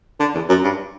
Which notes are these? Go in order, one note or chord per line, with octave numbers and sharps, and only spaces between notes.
D3
E2
F#2
G2